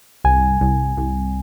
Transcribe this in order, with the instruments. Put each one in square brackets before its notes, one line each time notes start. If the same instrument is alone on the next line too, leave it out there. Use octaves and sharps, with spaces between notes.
[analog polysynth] C2 [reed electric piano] G#5
[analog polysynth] C2
C2